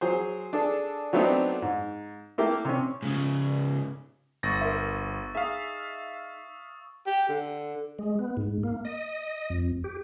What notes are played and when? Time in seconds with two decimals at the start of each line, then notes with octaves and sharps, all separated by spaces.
0.01 F#3 G#4 C5
0.53 D4 G#4 A4
1.13 F#3 A3 B3 C4 D4 D#4
1.62 G#2
2.38 A3 A#3 E4 G4
2.65 C3 C#4
3.02 G#2 C#3
4.43 G1 C#6 E6 A6 A#6
4.61 A#4 C5 E5
5.35 D#4 G#4 E5 F5 C#6 D#6
7.07 G4
7.29 D3
7.99 G#3
8.19 B3
8.37 G#2
8.63 A#3
8.85 D#5
9.50 F2
9.84 G4